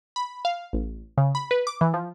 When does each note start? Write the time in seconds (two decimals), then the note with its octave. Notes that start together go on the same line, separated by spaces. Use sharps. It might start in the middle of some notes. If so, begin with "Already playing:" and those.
0.16 B5
0.45 F5
0.73 A1
1.18 C#3
1.35 B5
1.51 B4
1.67 D6
1.81 E3
1.94 F3